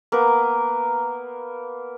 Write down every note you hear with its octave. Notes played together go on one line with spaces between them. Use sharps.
A#3 B3 A#4 B4